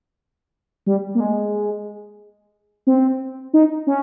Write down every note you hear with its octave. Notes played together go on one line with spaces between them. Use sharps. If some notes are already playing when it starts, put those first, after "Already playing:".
G3
A#3
G#3
C4
D#4
C#4